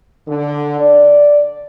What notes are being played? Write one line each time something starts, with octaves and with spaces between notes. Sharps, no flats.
D3
D5